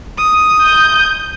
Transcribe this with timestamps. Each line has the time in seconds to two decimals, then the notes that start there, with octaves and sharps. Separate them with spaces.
0.18 D#6
0.63 G6